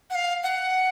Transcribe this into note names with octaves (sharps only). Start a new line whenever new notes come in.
F#5
F5
F#5